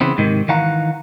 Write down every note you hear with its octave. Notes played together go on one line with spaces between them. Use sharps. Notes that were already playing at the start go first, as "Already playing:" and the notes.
C#3 E3 B3 C4
G#2 C3 D#3
D#3 E3 F5 F#5 A#5